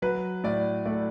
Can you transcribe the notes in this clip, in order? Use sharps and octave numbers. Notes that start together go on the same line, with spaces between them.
F#3 B4
A2 D5
A3 D5